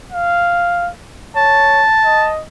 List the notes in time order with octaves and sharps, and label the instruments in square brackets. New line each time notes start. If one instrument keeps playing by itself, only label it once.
[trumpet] F5
[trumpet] C#5 [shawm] A5
[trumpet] D#5